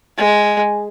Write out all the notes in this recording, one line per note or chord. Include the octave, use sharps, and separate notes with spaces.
G#3